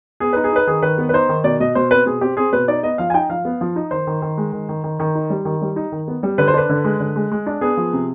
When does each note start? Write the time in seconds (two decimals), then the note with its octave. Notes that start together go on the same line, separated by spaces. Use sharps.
0.20 B3 G#4
0.33 D#4 B4
0.44 G#4
0.52 D#4 B4
0.67 D#3 G#4
0.83 D#3 B4
0.98 B3
1.09 B4
1.13 D#4 C5
1.29 D#3
1.44 B2 D5
1.60 B2 D#5
1.75 B2 C5
1.91 C4 B4
2.06 B2 G#4
2.21 C4 G4
2.37 C4 G#4
2.53 B2 B4
2.68 D#4 D5
2.83 B3 D#5
2.98 F3 F5
3.10 G#5
3.14 D#4 G5
3.30 F3 F5
3.45 B3
3.61 F3
3.76 D#4
3.91 D#3 C5
4.07 D#3
4.22 D#3
4.38 G#3
4.53 D#3
4.69 D#3
4.84 D#3
5.00 D#3
5.15 D#4
5.30 G3
5.45 D#3
5.62 G3
5.76 D#4
5.92 D#3
6.08 B3
6.23 G3
6.38 D3 B4
6.48 C5
6.54 D4 B4
6.69 D3
6.84 G#3
7.00 D3
7.16 G#3
7.32 G#3
7.46 D4
7.61 B3 G#4
7.77 F3
7.93 C3